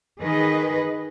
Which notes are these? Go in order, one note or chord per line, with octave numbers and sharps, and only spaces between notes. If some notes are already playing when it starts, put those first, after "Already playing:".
D#3 G#4 B4 D#5